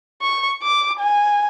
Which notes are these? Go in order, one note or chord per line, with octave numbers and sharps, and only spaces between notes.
C#6
D6
G#5